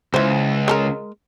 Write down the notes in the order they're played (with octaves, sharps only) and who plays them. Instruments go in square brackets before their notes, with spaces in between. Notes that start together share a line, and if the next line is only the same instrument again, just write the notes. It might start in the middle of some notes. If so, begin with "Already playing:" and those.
[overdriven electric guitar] C#2 [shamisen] E3 C5
[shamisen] G#3 A4 A#4